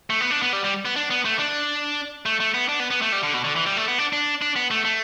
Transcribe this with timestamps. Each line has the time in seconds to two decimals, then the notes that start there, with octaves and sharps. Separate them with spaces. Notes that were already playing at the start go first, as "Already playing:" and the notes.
0.10 A3
0.21 B3
0.31 D4
0.42 B3
0.53 G3
0.64 G3
0.85 B3
0.96 D4
1.11 B3
1.25 A3
1.39 D4
2.26 A3
2.40 A3
2.54 B3
2.69 D4
2.80 B3
2.91 B3
3.02 A3
3.12 G3
3.23 D3
3.34 B2
3.44 D3
3.56 E3
3.66 G3
3.77 A3
3.88 B3
3.98 D4
4.13 D4
4.42 D4
4.56 B3
4.71 A3
4.85 A3